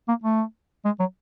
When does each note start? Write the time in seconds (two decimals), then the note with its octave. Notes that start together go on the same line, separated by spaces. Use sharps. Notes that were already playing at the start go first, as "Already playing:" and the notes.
0.08 A#3
0.24 A3
0.85 G#3
0.99 F#3